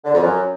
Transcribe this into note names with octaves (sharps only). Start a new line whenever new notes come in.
D3
F2
F#2